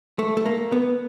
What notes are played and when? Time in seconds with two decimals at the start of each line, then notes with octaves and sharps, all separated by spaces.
0.19 A3
0.37 A3
0.46 A#3
0.72 B3